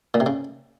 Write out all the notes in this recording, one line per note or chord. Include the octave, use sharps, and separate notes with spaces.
A#2
C3
C#3